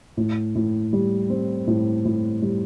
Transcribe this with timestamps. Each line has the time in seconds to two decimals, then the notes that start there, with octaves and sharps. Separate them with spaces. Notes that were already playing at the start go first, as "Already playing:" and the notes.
0.17 A2
0.55 A2
0.93 G3
1.30 C4
1.67 A2
2.05 A2
2.42 G3